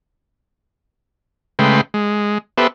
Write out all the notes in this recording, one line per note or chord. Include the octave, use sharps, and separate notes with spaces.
C#3 G#3 A3 B4 G5 C6
G#3
B3 G4 A4 B4 C5 E5